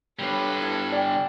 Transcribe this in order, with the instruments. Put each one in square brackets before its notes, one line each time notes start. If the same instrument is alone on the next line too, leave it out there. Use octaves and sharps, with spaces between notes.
[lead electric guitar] D3 G3 [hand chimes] B3 C#5 [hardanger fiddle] A4 B4
[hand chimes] B3 E4 G#6
[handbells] D5 G5 [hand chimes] G#5